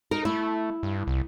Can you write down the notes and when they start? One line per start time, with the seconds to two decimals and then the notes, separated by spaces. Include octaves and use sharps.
0.11 D#4 A#4
0.25 A3 E4
0.83 G2
1.07 C2